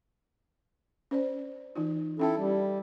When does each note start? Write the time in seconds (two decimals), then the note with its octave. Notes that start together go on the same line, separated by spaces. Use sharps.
1.11 C#4 C5 D5
1.76 E3 D#4 F4
2.19 C#4 E4 A4 G5 A5
2.37 G3